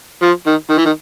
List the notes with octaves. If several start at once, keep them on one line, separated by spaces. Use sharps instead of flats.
F3
D#3
D#3
E3
D#3